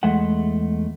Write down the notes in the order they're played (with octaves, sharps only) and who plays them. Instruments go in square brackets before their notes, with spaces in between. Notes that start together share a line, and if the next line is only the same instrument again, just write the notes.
[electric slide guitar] E2 G#3 A3 F#5